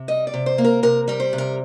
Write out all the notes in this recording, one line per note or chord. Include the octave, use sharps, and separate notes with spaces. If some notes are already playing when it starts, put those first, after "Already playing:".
Already playing: C3
G3 D#5
D5
C3
C5
A#3
A#4
C3 A#4
G3 A#4
C5
C3
A#4